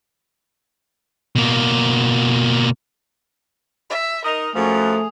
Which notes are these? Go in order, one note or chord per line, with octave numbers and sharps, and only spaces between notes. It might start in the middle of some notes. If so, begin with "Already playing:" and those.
B2 A#3
E5
D#4 A#4 D#5 D#6 F7
F#2 F3 A3 G#4